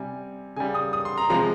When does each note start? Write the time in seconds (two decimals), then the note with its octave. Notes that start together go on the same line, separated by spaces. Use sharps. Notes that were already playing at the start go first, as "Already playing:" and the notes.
Already playing: C3 G3 G#5
0.56 C#3 G#5
0.60 G3
0.75 D#6
0.93 D#6
1.05 C6
1.18 A#5
1.30 C3 F3 G#3 A#5